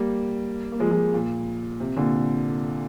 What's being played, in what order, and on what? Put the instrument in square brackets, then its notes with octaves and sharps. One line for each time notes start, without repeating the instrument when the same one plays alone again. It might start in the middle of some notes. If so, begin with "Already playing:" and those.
Already playing: [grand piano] G3 A#3
A#3
F3 G#3
F3 G#3
A#2
C3
A#2 D3